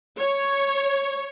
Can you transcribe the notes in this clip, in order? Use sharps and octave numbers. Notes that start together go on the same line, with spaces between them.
C#5